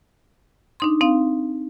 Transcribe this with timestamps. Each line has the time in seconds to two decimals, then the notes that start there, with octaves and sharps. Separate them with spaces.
0.80 D4 D#4 C6
1.01 C4 D#4 F5